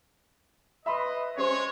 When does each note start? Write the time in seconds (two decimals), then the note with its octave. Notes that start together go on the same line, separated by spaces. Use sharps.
0.86 B4 D#5 E5 B5 C6
1.38 G#3 C#4 G4 C5 C#5 C6